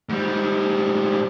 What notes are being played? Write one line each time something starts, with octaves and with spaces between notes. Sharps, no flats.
G#2 G3